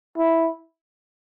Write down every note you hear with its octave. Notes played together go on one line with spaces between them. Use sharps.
E4